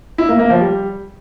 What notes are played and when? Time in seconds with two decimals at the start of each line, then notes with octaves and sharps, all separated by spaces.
0.18 E4
0.29 A#3
0.39 A#3
0.50 F3
0.60 G3